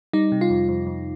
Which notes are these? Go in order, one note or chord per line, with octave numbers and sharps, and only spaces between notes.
G3 D#4
C3
F4
F2
F2
F2